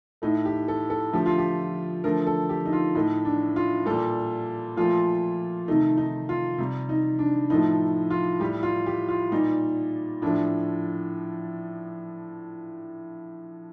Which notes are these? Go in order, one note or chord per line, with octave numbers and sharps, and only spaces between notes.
A2 A3 D#4
G4
A4
A4
D3 F3 A3 G4
F4
G4
D3 F3 A3 A#4
A4
G4
D#4
F4
A2 A3 D#4
D4
F4
A#2 G3 A4
A#2 F3 A3 F4
C3 D#3 A3 D#4
D#4
F4
C3 G3
D#4
D4
A2 F3 A3 D#4
F4
A2 G3 G4
F4
G4
F4
A#2 G3 D#4
A2 F3 A3 D4